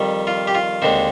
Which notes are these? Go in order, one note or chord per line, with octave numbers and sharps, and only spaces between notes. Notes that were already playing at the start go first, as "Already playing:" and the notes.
Already playing: F2 D#3 G3
F4
G4
F4
D#2 D3 G#3 C4